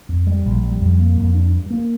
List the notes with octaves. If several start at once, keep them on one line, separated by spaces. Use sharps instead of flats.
F2
G3
A#1
G3
F2
A#3
F2
D4
G2
A#3